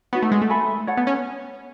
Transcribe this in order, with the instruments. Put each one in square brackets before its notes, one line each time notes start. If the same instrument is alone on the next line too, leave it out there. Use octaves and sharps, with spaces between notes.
[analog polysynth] B3 [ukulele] D#4 F#4 C#5
[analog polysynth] A3
G#3
A3
[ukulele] A4 E5 G#5 B5
A4 C#5 F#5
[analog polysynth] B3
C#4